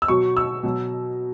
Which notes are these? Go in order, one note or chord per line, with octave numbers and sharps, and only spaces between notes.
E6
B2 F#3 C#6
E6
B2 F#3